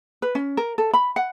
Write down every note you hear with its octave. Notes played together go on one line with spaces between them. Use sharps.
B4
C#4
A#4
A4
B5
F#5